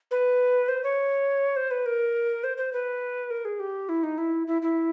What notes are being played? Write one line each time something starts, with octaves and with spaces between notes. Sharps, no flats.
B4
C5
C#5
C5
B4
A#4
C5
C5
B4
A#4
G#4
G4
E4
D#4
E4
E4
E4